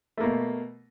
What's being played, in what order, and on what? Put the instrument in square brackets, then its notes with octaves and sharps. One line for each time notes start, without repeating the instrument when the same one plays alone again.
[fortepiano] A3
A#3
B2